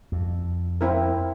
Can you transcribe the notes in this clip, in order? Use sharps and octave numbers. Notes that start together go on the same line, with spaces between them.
F2
C4 E4 A#4